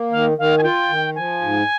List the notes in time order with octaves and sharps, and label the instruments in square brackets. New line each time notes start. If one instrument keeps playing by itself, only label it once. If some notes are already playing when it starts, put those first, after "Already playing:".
Already playing: [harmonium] A#3
[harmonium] D#3 [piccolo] F5
[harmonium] D#3 [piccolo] F5
[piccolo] G#5
[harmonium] F4 [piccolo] G5
[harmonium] D#3
[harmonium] F3 [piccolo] G#5
[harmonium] G#2